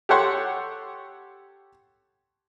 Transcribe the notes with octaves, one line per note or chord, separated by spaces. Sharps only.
G4 A4 C#5 F#5 C6 C#6